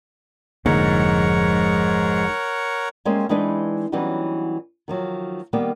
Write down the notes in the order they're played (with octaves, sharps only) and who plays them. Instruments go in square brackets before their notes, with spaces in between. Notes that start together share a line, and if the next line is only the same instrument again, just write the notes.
[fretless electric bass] F1 D3 A#3 [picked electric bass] G#2 [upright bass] F3 [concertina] A#4 C#5 F#5
[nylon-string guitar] G3 G#3 A#3 C4 C#4
E3 G#3 C4 D4 D#4 B4
E3 F#3 G3 B3 C#4 D#4
D#3 F3 F#3
D#3 G3 A#3 B3